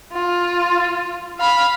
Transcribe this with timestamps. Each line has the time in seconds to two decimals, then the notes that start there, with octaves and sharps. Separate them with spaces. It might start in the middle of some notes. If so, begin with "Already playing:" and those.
0.12 F4
1.39 F5 B5